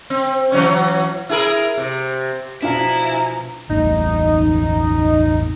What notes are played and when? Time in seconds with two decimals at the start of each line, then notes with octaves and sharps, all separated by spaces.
0.10 C4
0.52 E3 F#3 C#4
1.29 E4 G#4 A#4
1.77 C3
2.62 B2 F3 D4 E4 F4 F5 G#5 A#5
3.69 E1 A1 D#4